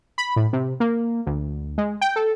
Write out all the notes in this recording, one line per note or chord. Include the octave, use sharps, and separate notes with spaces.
B5
A2
C3
A#3
D2
G#3
G5
A4